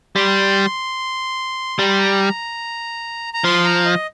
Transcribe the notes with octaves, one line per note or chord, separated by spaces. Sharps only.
G3 C6
G3 A#5
C6
A#5
A#5
F3 C6
A#5
D#5